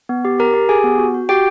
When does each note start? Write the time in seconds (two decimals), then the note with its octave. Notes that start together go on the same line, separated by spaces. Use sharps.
0.09 B3
0.25 G4
0.39 G4 A#4 A#5
0.54 G4
0.69 G4 G#4 G#5
0.84 B3
0.98 F#4
1.14 F#4
1.29 F#4 G4 G5